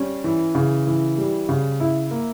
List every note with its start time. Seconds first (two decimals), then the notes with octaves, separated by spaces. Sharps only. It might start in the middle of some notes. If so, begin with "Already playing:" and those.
Already playing: G3 C#4
0.24 E3
0.55 C#3
0.87 E3
1.18 G3
1.49 C#3
1.80 E4
2.11 A#3